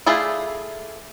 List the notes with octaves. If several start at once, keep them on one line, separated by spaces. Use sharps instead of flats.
A3 E4 F4 G#4 D5